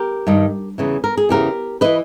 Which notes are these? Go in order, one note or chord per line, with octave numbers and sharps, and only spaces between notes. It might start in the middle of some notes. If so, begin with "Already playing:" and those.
Already playing: G4 A#4
G2 D#3
E2 C#3 E3
A#4
G#4
E2 C#3 E3 G4 A#4
E3 B4 D#5